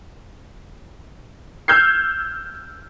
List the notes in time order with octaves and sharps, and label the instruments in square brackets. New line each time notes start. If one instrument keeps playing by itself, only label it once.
[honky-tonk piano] E6 F6 G6 G#6 C7